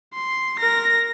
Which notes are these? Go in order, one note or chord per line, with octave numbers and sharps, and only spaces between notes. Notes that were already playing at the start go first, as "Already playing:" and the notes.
C6
A#4 A#6